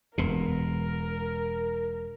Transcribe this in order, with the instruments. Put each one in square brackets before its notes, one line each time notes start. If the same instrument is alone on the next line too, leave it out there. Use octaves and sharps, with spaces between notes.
[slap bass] E1 B2 [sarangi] A#4